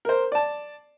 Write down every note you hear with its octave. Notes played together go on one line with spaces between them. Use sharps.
A#4 C5
D5 A5